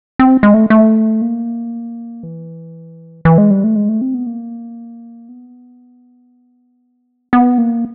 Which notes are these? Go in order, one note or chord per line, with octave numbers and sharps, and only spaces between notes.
C4
G#3
A3
A3
A#3
E3
E3
G#3
G3
A3
G#3
A3
C4
B3
A#3
B3
B3
A#3